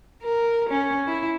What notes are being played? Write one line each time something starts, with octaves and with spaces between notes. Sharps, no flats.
A#4
C#4
E4